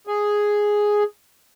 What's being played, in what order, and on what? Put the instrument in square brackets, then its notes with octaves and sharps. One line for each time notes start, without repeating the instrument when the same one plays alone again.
[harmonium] G#4